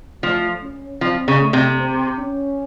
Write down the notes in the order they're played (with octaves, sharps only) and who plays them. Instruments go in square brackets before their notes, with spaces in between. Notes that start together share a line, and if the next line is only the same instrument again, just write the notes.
[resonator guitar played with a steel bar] F3 [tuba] A3
[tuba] C#4
[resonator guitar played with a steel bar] F3 [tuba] C4
[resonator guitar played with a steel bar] C#3
[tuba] A3
[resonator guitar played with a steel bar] C3
[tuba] C4
C#4